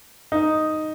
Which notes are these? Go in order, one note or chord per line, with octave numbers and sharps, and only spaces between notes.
D#4